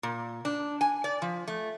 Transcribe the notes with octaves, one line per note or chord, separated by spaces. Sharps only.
A#2
D4
G#5
D5
F3
A3